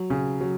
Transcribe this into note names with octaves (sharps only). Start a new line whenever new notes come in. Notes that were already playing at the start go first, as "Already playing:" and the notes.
Already playing: F#3
C#3
F#3